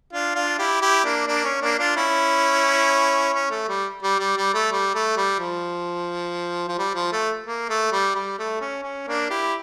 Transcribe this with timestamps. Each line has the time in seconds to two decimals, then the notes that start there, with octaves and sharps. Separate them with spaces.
0.13 D4 F4
0.35 D4 F4
0.59 E4 G4
0.81 E4 G4
1.04 A#3 D4
1.27 A#3 D4
1.45 C#4
1.62 A#3 D4
1.79 D4 F4
1.96 C#4 E4
3.34 C#4
3.50 A3
3.68 G3
4.03 G3
4.19 G3
4.37 G3
4.54 A3
4.72 G3
4.95 A3
5.17 G3
5.40 F3
6.68 F3
6.78 G3
6.95 F3
7.12 A3
7.46 A#3
7.69 A3
7.92 G3
8.15 G3
8.39 A3
8.61 C#4
8.84 C#4
9.07 A#3 D4
9.30 E4 G4